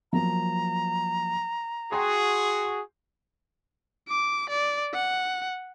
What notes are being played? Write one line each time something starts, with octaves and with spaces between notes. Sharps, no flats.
F3 F#3 A#3 A#5
F#4 G#4 G5 C6
D6
D5
F#5